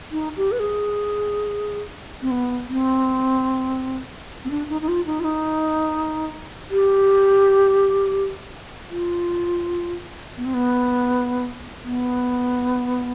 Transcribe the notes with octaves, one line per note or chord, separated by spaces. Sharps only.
D#4
G4
B4
G#4
C4
B3
C4
C4
D4
D#4
D#4
F4
D#4
F4
D#4
G4
F4
B3
C4
B3
B3